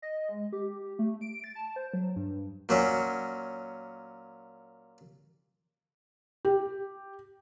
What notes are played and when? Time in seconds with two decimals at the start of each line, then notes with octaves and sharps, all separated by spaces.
0.02 D#5
0.29 G#3
0.53 G4
0.99 A3
1.21 D7
1.44 A6
1.55 A5
1.76 C5
1.94 F#3
2.16 G2
2.69 A#2 F#3 C#4
6.45 G4